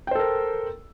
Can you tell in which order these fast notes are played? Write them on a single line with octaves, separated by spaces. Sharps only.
G5 C5 A4 A#4